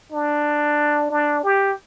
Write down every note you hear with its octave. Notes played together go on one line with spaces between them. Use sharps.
D4
D4
G4